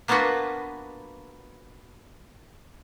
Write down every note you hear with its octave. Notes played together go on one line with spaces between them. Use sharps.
A#3 B3 D4 F4 F#4 B4